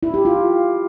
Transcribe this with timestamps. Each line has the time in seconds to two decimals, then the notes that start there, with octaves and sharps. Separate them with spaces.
0.03 E4
0.14 G4
0.25 F4